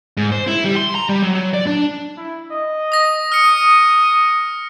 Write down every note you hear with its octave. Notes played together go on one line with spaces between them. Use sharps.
G#2
C5
E4
G3
C6
A#5
G3
F#3
F#3
D5
D4
E4
D#5
D#6 A#6
D#6 F6 C#7